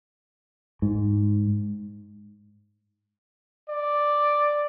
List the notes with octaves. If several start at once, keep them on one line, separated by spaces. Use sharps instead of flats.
G#2
D5